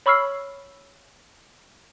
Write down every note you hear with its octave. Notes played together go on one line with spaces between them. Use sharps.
C#5 B5 C#6 E6 F6 C7